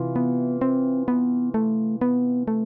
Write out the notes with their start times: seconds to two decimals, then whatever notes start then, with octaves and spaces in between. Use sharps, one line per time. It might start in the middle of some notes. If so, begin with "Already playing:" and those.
Already playing: C3 E3 F4
0.16 B3
0.61 C4
1.08 B3
1.54 A3
2.01 B3
2.48 A3